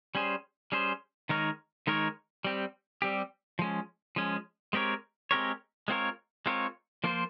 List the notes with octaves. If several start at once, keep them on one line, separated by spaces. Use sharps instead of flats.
G3 C#4 G#4 C5
G3 C#4 G#4 C5
D#3 G#3 D#4 A#4 C#5
D#3 G#3 D#4 A#4 C#5
G3 C4 G4
G3 C4 G4
F3 G#3 C#4
F3 G#3 C#4
G#3 C4 G4 A#4 C#5
G#3 C4 G4 A#4 C#5
G#3 C4 F4 A#4 C#5
G#3 C4 F4 A#4 C#5
F3 A#3 F4 C5